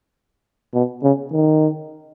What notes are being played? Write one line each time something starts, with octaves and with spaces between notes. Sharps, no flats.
B2
C#3
D#3